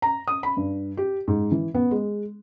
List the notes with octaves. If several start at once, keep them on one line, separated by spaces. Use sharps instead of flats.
A#5
D#6
B5
G2
G4
G#2
E3
B3
G#3